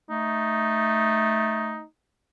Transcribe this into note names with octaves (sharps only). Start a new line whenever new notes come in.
A3 D#4